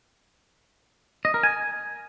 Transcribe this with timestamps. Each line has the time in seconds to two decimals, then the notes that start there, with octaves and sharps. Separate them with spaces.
1.25 D#5
1.34 A#4
1.43 G#5